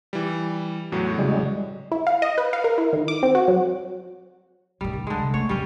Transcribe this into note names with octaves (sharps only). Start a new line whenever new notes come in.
E3 G3
E2 A2 F#3 F#4
C#3 G3 G#3
E4
F5
D#5
B4
F5
A#4
E4
D#3
D6
C4
F#4
F#3
A2 D#3 G3
D2
D3 G#3
C3
A3 C#5
D#1 G3 C#4